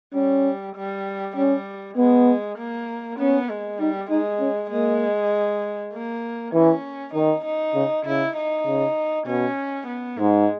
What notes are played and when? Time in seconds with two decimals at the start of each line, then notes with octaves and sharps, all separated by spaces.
0.14 G3 C#4
0.76 G3
1.36 G3 C#4
1.97 G#3 B3
2.58 A#3
3.19 B3 C#4
3.49 G#3
3.80 G3 D#4
4.10 G#3 D#4
4.40 C#4
4.70 G#3 A#3
5.93 A#3
6.53 E3 C#4
7.14 D#3 D#4
7.45 D#4
7.75 C#3
8.06 C#3 E4
8.37 D#4
8.67 C#3
9.27 B2 C#4
9.88 B3
10.18 G#2 G#3